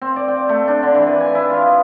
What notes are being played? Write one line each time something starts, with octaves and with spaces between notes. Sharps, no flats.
C4
D5
G5
A3
D4
D3
E3
B4
G#5
E4
F4
D#5